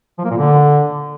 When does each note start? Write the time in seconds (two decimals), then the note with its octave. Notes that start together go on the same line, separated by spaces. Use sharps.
0.18 F3
0.24 A#3
0.30 A#2
0.36 D3